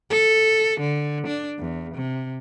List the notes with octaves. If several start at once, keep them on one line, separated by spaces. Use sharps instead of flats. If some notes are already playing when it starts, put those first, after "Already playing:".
A4
D3
D4
E2
C3